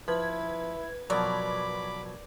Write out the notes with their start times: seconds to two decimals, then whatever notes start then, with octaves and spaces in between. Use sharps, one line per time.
0.08 F3 E4 B4 G#6
1.10 B2 F3 F#3 A#4 D5 B5 D6